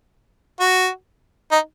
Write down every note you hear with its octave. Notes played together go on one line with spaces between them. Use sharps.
F#4
D#4